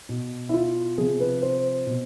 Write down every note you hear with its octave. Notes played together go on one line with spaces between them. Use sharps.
B2
E4
F4
C3 F3 G#4
B4
C5
B2